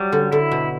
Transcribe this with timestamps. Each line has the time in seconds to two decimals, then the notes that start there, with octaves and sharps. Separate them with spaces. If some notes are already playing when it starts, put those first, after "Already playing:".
Already playing: F#3 G3
0.12 D3
0.32 D3 E4
0.51 B2